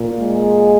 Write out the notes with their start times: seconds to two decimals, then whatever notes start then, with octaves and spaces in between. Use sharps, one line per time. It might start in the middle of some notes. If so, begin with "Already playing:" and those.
Already playing: A#2
0.19 G#3